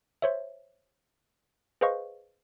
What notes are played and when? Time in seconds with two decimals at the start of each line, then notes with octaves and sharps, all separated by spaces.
0.22 C5 C#5 E5
1.81 G#4 B4 C5 D#5 F5 C#6